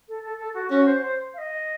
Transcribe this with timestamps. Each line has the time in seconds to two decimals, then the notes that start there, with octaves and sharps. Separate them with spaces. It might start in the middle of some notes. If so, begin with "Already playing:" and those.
0.08 A4
0.23 A4
0.38 A4
0.54 F#4
0.71 C#4 F#4
0.86 C5
1.02 C5
1.34 F5
1.38 D#5